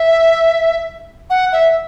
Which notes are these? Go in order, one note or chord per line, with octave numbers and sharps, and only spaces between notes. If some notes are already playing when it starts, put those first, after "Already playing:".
Already playing: E5
F#5
E5